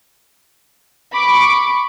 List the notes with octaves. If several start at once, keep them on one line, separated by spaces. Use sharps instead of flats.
B5 C#6 D6